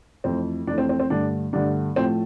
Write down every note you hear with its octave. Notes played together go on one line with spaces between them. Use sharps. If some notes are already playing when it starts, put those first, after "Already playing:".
F2 E3 A3 C4
F2 E3 A3 D4
C4
C4
C4
G2 D3 A3 D4
G2 D3 A3 D4
A2 F3 A3 C4